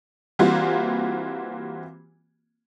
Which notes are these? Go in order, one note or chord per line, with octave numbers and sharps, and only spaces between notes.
E3 G3 A#3 C4 F4 F#4